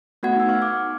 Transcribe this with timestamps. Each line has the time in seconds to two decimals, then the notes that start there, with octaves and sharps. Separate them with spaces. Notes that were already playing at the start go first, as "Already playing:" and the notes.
0.23 A3 B3 F#4 F#5 G#6
0.36 D#4 E6
0.49 F5 C#6 F6
0.62 D6